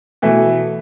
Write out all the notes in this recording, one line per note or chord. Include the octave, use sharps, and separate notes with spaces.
B2 E3 A3